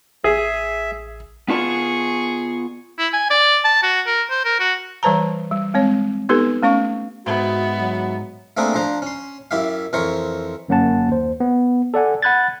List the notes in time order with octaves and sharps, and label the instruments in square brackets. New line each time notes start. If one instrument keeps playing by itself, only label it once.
[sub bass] A1 [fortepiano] G#4 [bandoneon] E5
[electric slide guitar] B3 F4 A5 [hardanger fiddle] G#4 C#6
[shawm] E4
G#5
D5
A5
F#4
A#4
C5
A#4
F#4
[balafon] E3 G3 B4 C5 A5 A#5
G3
G#3 C4 C#5
B3 D#4 G4 A4 B4
A3 C#4 F5 C#6
[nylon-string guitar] G#2 [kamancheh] B3 E5 [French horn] F#4
[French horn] F#3
[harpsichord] A3 A#3 C4 D4 G#4 A#4
F3 D4 C5 A#5
C#4 C6
F#2 E4 G4 E5 F5
F2 E3 A#4 C5 C#5 C#6
[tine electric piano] G1 F#2 A#3 C#4 F#5 A5
D#2 C5
B3
A4 D5 F#5 G#5
F#5 B5 F#6 G#6 A6